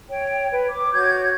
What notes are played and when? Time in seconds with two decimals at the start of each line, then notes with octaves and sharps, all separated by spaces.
0.10 C#5 G5
0.50 B4
0.69 D6
0.92 F#4 C#5 G6 G#6